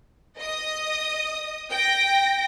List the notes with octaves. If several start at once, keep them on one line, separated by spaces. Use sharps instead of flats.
D#5 D#6
G5 A#6